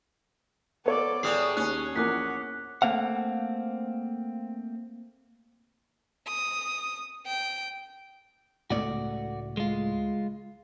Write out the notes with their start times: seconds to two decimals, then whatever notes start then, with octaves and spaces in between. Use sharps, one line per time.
0.86 B3 A4 C#5 D5
1.23 A2 G3 G#4 D#6 C7
1.57 D#2 C#4 F#6
1.96 A#1 E2 A#4 F#5 D6 F#6 B6
2.82 A3 A#3 C4 F5 F#5
6.27 D#6
7.27 G5
8.70 C#2 A2 A3 F#4 D5
9.57 G#3 F4